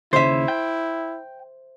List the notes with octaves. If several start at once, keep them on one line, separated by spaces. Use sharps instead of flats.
D#2 C#3 E4 C5 E5
G5